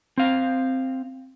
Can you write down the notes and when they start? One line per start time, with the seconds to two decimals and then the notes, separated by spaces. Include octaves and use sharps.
0.18 C4 F5